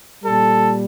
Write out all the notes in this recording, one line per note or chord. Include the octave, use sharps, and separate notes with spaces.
A#2 G3 A4